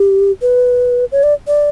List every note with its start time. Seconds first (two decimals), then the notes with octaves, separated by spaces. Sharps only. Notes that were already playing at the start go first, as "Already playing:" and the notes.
Already playing: G4
0.42 B4
1.12 C#5
1.23 D5
1.47 D5